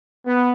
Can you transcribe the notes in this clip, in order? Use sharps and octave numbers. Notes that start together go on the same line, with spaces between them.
B3